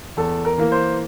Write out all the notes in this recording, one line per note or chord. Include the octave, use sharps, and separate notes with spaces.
E2 A4
A#4
E3 A#3
C5